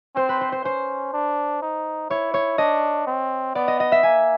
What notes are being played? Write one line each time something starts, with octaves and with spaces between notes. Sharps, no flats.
C4 C5
B4
C5
C5
C#4 C5
D4
D#4
E4 C#5
C#5
D4 D#5
C4
B3 D5
D#5
D#5
E5
A#3 G#5